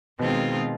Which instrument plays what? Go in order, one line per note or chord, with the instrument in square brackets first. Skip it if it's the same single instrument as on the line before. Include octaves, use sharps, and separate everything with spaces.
[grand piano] B2 [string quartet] D#3 G#3 C4 F4